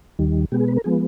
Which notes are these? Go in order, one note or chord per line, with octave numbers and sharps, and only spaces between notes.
D#2 D#3 G3
B2 G#3 B3 G4
G#4
B4
A#4
F3 G#3 B3 G#4